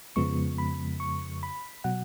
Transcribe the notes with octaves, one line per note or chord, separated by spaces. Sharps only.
F2 C#3 F3 G#3 B3 C#6
B5
C#6
B5
B2 F#3 F#5